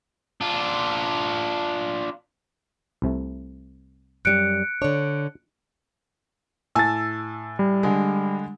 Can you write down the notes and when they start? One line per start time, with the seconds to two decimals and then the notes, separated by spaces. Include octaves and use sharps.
0.41 D4 F4
3.02 C2 C3 A3
4.25 F#2 G3 F#6 C#7 D7
4.82 D3 D4 C#5
6.75 A2 G#5 A5 E6 A6
7.59 G3
7.83 D3 G#3